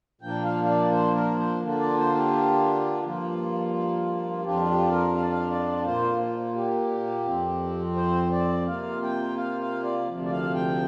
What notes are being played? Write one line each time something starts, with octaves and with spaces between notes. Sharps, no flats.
A#2 F3 A#3 D4 G5
F5
F5
D5
C5
A#4
C5
D3 A#3 D4 F4
D5
C5
G4
G2 F3 A#3 F4
F2 F3 D4 F4 G4
G4
A#4
F5
D5
F5
D5
A#2 A#3 F4 C5
F4
G4
F2 F3 C4
C5
D5
C3 A#3 F4 F5
G5
F5
F5
D5
D2 C3 F3
D5
F5
G5